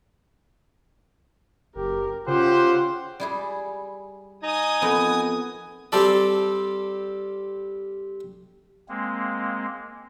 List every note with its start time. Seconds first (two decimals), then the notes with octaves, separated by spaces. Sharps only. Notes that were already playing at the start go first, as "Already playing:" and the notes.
1.76 F#1 G4 A#4
2.27 C#3 F4 G4 C5 F#5 C6
3.20 G3 E4 G#4
4.43 D#4 G#5 D#6
4.82 F2 B3 A#4 B5
5.92 G3 C4 A4 D5
8.89 G#3 A#3 C4